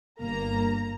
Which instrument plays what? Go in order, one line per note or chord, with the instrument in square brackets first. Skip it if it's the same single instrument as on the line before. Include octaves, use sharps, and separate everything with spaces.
[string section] G1 A#3 A#5